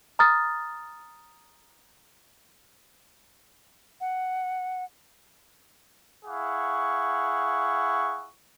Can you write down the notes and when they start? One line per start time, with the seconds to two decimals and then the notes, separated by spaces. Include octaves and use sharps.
0.19 A#5 D#6 F6 A6
4.00 F#5
6.25 E4 G#4 F5 F#5 C#6